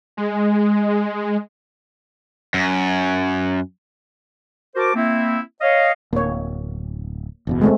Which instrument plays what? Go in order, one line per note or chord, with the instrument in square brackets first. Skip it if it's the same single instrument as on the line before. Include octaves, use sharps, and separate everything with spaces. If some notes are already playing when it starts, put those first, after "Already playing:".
[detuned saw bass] G#3
[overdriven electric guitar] F#2
[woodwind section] F#4 A#4 C5 A5 D6
A#3 C4 E4
C#5 D#5 F5
[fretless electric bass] D1 [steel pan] A#3 C#5
[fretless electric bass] F#1 E2 B2
[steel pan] G#3 A3 C4